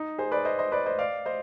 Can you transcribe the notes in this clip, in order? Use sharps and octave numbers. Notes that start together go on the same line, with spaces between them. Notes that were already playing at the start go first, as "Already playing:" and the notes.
Already playing: D#4
G#4 C5
B4 D5
C5 D#5
C5 D#5
B4 D5
C5 D#5
D5 F5
C5 D#5